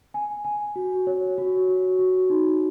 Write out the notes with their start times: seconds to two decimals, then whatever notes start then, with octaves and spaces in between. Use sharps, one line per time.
0.14 G#5
0.45 G#5
0.76 F#4
1.07 C#5
1.38 F#4
1.69 F#4
1.99 F#4
2.30 D#4